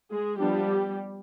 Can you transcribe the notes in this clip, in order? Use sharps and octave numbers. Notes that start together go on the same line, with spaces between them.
G#3 G#4
F3 G3 B3 D4 G4